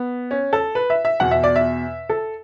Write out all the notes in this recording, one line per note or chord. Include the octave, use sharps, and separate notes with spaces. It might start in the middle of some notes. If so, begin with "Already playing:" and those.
Already playing: B3
C#4
A4
B4
E5
E5
E2 B2 F#5
E5
D5
E5
A4